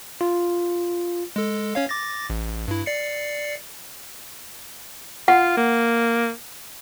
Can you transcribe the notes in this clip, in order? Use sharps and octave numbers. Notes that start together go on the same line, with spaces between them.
F4
G#3 A4
C#4 C#5 F5
D6 A6 A#6
A1
G2 E4
D5 C7 C#7
F4 F#5
A#3